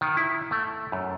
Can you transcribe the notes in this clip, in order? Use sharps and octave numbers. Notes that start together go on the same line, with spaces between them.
D#3
E4
A3
F#2